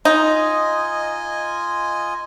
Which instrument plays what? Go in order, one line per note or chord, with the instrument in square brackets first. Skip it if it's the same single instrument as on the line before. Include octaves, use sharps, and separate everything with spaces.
[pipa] D#4 [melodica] F4 D#5 G#5